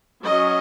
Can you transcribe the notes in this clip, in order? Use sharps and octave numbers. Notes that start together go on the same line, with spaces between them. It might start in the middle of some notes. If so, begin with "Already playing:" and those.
F#3 C#4 D#5